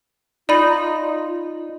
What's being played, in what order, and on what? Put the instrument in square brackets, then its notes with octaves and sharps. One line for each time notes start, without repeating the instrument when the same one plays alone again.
[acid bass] D#4 [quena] F4 [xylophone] D5 B5